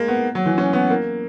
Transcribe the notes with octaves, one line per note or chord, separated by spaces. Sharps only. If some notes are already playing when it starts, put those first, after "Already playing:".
Already playing: G#3 A#3
B3
F#3
E3
C#4
B3
A#3